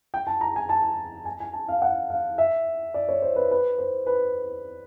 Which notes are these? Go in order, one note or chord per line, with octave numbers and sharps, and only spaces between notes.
G5
A5
A#5
G#5
A5
G#5
G#5
A5
F5
F#5
F5
E5
D5
C#5
C5
B4
B4
C5
B4